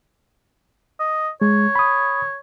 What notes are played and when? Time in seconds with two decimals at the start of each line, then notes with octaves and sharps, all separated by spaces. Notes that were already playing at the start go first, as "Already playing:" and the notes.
1.00 D#5
1.42 G#3 C#5
1.75 B5 D#6